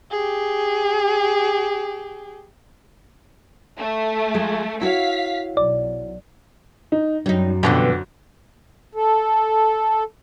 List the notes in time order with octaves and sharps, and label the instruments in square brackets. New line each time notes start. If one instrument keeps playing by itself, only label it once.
[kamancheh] G4 G#4
[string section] A3
[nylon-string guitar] F3 G#3
[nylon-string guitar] E4 F#4 C#5 [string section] F5 B6
[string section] B1 [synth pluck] D5
[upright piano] D#4
[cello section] F#2 [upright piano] F#3 [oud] G3 D#4
[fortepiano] F2 D3 [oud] B2 E3 G3
[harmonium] A4